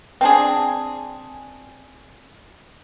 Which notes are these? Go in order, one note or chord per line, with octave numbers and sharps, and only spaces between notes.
C4 D4 G#4